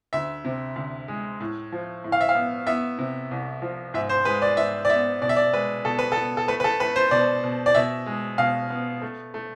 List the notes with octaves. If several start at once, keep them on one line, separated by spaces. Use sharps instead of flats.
D2 E5
C3
D2
G#3
A2
F3
A2
F5
E5
F5
B3
B3 E5
C3
C2
F3
G#2 E5
C5
G#3 B4
D5
G#2 E5
D5
B3 E5
B2 D5
E5
D5
G#3 B4
B2 A4
B4
B3 A4
A4
A3 B4
B4
A4
A3 B4
C5
B2 D5
B2
D5
B2 E5
G#3
B2 F5
B3
A3
A3